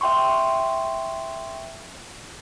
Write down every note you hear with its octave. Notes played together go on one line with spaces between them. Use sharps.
E5 G5 C6 C#6